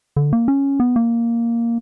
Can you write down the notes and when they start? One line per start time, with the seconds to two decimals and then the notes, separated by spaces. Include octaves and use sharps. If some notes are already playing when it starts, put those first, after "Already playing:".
0.16 D3
0.33 A#3
0.48 C#4
0.80 B3
0.96 A#3